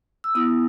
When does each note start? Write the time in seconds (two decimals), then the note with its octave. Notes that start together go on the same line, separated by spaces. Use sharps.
0.24 E6
0.35 B3 E4 D#6